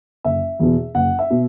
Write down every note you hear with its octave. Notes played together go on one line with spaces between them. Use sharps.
F#1 E5
E2 B2
F#1 F#5
E5
B2